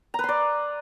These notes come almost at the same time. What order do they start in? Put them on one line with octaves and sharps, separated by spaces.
A#5 B4 C6 D5